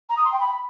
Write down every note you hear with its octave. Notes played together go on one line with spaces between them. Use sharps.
A#5
D#6
C6
G5
B5